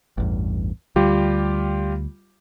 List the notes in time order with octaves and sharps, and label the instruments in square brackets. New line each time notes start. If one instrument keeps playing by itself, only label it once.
[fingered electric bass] A1 E2 G2
[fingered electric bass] D2 [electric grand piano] G3 F4 G4